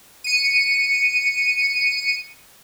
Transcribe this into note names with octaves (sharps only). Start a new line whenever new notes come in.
C#7 D#7